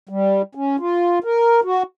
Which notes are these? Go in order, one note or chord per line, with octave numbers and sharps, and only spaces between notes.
G3
C#4
F4
A#4
F#4